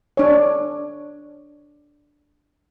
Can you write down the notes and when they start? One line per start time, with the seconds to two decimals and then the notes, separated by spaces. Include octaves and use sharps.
0.17 D4 C#5